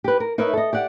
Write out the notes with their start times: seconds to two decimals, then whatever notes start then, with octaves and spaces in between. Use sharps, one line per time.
0.04 G4 B4
0.20 A#4
0.38 D#4 A#4 B4 C#5 E5
0.53 A4 D#5
0.73 G4 D5 F#5